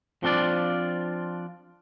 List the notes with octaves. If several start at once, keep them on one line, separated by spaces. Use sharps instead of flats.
F3 C4 D4 F4 D5